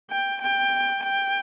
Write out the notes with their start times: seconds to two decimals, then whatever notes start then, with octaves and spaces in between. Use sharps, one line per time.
0.10 G5
0.42 G5
1.03 G5